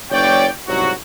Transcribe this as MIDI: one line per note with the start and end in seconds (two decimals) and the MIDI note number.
0.11 0.46 30
0.11 0.46 73
0.11 0.46 74
0.11 0.46 79
0.68 0.90 36
0.68 0.90 44
0.68 0.90 49
0.68 0.90 54
0.68 0.90 66